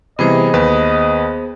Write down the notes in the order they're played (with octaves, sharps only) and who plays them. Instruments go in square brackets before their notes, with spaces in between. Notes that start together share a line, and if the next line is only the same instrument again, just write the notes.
[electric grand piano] C3 E3 G3 [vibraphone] B3 G#4 C5 [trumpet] D#5
[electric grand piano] D#2 B4